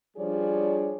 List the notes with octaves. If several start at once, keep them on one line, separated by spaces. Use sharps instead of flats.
F3 G3 D4 G#4 C#5 D5